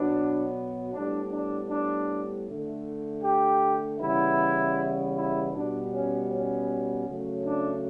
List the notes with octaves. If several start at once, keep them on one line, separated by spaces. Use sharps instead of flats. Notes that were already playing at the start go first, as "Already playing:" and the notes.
Already playing: B2 F#3 B3 D4
A2 G3 B3 D4
D4
D4
D3 A3
G4
C#3 E3 G3 B3 E4
E4
B2 G3 B3 D4
C#4
C#4
C#3 F#3 A3
D4